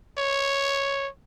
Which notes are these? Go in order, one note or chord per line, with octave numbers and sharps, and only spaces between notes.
C#5